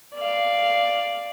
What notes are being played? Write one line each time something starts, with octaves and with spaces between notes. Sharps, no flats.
D5 F5